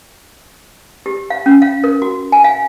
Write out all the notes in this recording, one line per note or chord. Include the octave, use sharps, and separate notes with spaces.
G4
F5
C#4
F5
A#4
F#4
G#5
F5